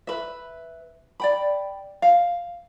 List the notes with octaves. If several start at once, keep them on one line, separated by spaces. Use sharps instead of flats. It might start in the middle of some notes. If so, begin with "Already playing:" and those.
B4 E5
D5 G5 B5
F5